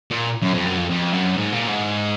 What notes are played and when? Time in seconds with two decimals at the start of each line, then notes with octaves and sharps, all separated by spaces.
0.11 A#2
0.42 F#2
0.54 F2
0.65 F#2
0.77 F2
0.90 F2
1.12 F#2
1.37 G#2
1.52 A#2
1.68 G#2